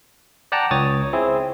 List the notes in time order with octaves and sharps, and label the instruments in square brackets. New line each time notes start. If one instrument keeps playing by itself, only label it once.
[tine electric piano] D5 F#5 G5 A5 A#5
C#2 C#5 D#6 A6
C4 E4 G#4